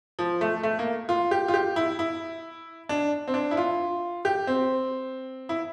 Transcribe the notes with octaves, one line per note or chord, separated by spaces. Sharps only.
F3
A3
A3
A#3
F4
G4
F4
G4
E4
E4
D4
C4
D4
E4
F4
G4
C4
E4